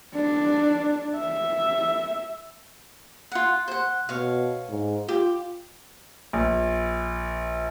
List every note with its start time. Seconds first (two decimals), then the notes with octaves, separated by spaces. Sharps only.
0.15 D4
1.17 E5
3.32 F4 F#5
3.68 C5 F#5
4.09 B2 C#5 F5
4.69 G#2
5.08 F4 G4
6.33 A#1